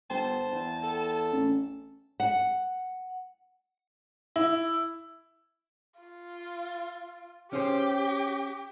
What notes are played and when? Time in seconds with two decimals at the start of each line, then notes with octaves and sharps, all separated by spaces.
0.10 G1 C5 G5 A5
0.52 E2
0.83 A4
1.33 A1 C#4
2.20 F#5
4.36 E4
6.00 F4
7.53 C#4 G4 G#4 C5